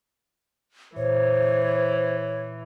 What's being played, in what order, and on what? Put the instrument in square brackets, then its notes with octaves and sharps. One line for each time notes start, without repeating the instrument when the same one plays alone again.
[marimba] A#2 [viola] E3 [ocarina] C5 [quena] C#5